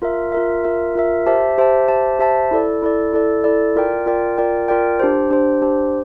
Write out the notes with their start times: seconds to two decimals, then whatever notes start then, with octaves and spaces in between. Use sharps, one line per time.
0.02 F4 A#4 E5
0.32 F4 A#4 E5
0.64 F4 A#4 E5
0.95 F4 A#4 E5
1.26 G4 C5 E5 A5
1.58 G4 C5 E5 A5
1.88 G4 C5 E5 A5
2.19 G4 C5 E5 A5
2.51 E4 A4 D5
2.82 E4 A4 D5
3.13 E4 A4 D5
3.44 E4 A4 D5
3.76 F4 A#4 D5 G5
4.06 F4 A#4 D5 G5
4.37 F4 A#4 D5 G5
4.68 F4 A#4 D5 G5
4.99 D4 G4 C5
5.31 D4 G4 C5
5.62 D4 G4 C5